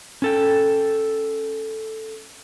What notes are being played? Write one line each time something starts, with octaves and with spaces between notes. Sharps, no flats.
C#4 A4 G5